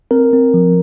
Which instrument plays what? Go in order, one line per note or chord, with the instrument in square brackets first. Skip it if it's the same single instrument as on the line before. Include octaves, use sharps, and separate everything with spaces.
[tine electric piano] C4 A#4
C4
F3